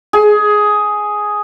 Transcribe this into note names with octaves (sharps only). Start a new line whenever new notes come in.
G#4